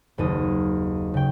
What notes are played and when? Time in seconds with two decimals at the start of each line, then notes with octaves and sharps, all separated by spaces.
0.18 F#1 D#2 D#6
1.14 C#3 G5